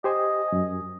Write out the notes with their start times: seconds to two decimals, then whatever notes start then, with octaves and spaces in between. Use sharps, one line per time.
0.04 G4 C5 D#5 G#5
0.48 F#2 G#5